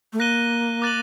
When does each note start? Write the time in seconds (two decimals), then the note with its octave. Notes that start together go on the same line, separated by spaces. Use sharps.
0.13 A3
0.19 A#3 F#6 A#6 D#7 G7
0.82 D6 F#6 A6 D#7 F#7